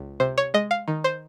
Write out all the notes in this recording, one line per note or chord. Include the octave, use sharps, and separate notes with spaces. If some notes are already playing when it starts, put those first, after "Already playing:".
Already playing: C#2
C3 C5
C#5
G#3 D#5
F5
D#3
C5